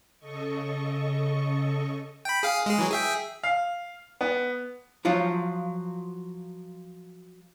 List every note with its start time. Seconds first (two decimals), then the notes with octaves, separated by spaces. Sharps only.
0.19 C#3 A4 D#5 C#6
2.25 G5 B5
2.43 G#4 F5
2.66 G#3 G#4
2.78 E3 F#3
2.91 G#4 E5 G5
3.43 F5
4.21 B3
5.05 F3 F#3 F4